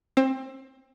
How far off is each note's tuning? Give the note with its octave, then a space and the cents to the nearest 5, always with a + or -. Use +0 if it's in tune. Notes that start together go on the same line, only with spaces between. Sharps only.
C4 +25